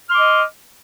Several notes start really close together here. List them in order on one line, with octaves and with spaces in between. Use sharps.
F6 C6 D6 D#5